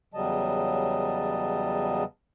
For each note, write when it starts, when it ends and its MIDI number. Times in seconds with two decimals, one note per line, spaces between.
0.14 2.04 40
0.14 2.04 49
0.14 2.04 54
0.14 2.04 55
0.14 2.04 75
0.14 2.04 81